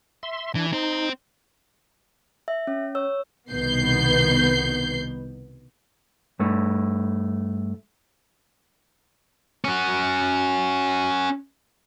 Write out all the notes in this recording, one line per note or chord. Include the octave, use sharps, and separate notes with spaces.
E5 C6
E3 D4
C4 D#4 C5
E5
C#4
C#5 E6
C2 B2 D#3 B3 G6 C7
G2 A3
C#4 F#4